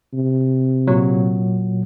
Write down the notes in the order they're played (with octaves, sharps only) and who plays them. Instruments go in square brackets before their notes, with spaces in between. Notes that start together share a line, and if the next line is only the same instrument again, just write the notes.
[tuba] C3
[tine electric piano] A#2 F#3